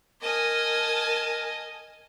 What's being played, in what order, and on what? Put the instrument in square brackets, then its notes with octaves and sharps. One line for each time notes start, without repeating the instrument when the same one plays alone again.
[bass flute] A#4 [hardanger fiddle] D#5 [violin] G#5 A5